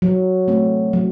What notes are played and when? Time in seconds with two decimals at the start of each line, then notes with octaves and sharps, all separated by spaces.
0.02 F#3
0.48 A3 C4
0.93 F#3